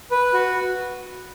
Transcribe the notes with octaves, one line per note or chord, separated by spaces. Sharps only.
B4
F#4